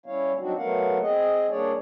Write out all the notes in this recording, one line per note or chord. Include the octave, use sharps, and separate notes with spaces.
G3 C#4 E4 C#5 F5
F#3 G3 C4 D4 D#4 F#4
F#3 A3 B3 A#4 F5 F#5
C4 G#4 D#5
G3 A#3 D4 G#4 C#5 D5